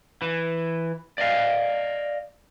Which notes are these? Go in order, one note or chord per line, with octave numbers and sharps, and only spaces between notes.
E3
D5 D#5 F5